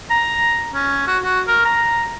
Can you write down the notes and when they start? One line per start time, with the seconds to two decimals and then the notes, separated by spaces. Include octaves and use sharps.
0.11 A#5
0.73 C#4
1.08 F#4
1.24 F#4
1.48 A#4
1.65 A#5